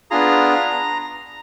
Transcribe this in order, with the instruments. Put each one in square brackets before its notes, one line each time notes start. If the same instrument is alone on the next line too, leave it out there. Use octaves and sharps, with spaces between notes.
[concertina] B3 D4 F4 G#4 A#5